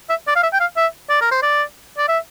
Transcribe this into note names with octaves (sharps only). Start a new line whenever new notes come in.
E5
D5
F5
E5
G5
F5
E5
D5
A#4
C5
D5
D5
E5